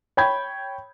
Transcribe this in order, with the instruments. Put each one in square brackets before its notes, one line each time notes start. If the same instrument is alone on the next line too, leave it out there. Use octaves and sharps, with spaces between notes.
[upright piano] C#5 G5 B5 G6 G#6